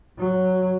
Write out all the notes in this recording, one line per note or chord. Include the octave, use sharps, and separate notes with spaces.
F#3